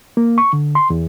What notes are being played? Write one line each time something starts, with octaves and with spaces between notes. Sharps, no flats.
A#3
C#6
D3
C6
E2